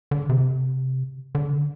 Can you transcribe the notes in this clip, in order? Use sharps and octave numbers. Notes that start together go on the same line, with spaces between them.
D3
C3
D3